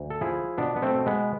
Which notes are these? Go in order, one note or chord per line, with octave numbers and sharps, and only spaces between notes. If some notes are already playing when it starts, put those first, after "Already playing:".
Already playing: D2
A4
F3 E4 G#4
B2 B3 D4
B3
A3 C4
B2
G#3 B3